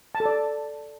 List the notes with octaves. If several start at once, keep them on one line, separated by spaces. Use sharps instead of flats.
A5
A4
D5